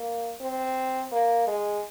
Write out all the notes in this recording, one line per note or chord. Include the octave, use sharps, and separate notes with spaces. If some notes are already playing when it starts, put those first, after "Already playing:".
Already playing: A#3
C4
A#3
G#3